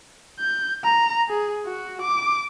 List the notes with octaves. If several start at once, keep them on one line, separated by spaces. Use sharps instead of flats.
G6
A#5
G#4
F#4
D6